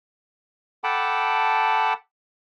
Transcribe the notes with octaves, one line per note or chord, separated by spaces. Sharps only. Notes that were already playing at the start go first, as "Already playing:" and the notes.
A4 F#5 G5 A5 B5 D6